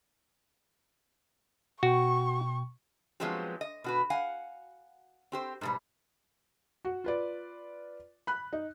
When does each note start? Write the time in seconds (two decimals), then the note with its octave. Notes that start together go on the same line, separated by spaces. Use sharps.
1.83 B2 F#4 G5 C#6
3.20 F3 F#3 G#3 B3 C4 G4
3.61 D#5
3.84 B2 F#4 B4
4.10 F5 F#5 G#5
5.32 C4 G4 C5
5.61 G#2 B2 G3
6.85 F#4
7.04 F4 B4 D5
8.27 B5 F#6
8.53 D#4